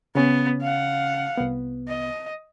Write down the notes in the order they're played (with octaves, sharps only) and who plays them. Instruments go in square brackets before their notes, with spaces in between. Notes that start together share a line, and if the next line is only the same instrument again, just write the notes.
[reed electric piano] C#3 C#4 [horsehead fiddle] B3
[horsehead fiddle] F5 F#5
[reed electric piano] C2 B3
[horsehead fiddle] D#5